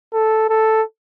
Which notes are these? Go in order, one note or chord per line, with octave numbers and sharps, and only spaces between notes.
A4
A4